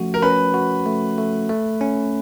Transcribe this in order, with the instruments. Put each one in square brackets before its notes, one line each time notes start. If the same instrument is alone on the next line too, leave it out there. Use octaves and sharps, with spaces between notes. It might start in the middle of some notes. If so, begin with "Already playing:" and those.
Already playing: [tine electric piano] F3 A3 C#4 F#4
[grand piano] A#4
[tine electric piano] C#4 [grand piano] B4
[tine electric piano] F#4
A3
A3
A3
C#4